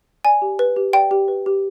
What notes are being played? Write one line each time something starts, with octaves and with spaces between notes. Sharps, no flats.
D5 G#5
G4
B4
G4
D5 G5
G4
B4
G4